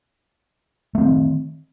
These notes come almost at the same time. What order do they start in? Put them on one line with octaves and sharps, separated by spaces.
A3 C4 D#3